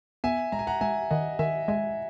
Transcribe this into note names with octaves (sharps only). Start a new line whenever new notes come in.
B3 E5 G#5
G#3 A#5
G#5
F#5 A#5
G#3 E5 G#5
D#3 D#5 F#5
D#3 E5 G#5
G#3 E5 G#5